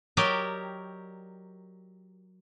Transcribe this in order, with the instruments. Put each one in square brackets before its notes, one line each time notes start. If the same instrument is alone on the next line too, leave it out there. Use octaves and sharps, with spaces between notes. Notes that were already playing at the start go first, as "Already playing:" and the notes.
[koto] F#3 G4 A#4 D5 D#5 G5